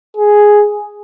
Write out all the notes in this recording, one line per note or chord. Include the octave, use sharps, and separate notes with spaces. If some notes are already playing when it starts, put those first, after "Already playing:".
G#4